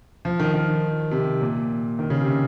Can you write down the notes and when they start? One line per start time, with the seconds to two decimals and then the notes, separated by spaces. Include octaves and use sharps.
0.25 F3
0.40 D#3
0.54 D#3
1.11 C3
1.41 A#2
1.99 D#3
2.10 C#3
2.21 C3